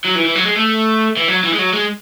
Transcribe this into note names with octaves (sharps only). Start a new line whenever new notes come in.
F#3
E3
E3
F#3
G#3
A3
E3
F#3
E3
G#3
F#3
G#3